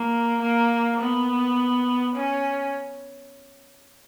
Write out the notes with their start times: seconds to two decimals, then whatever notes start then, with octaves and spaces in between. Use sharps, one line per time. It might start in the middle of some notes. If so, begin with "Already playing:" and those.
Already playing: A#3
0.42 A#3
1.00 B3
2.16 C#4